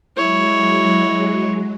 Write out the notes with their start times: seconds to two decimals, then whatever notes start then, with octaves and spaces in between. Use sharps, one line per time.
0.17 F#3 G#3 E4 C#5